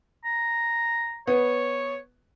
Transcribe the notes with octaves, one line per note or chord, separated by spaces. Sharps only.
A#5
B3 C#5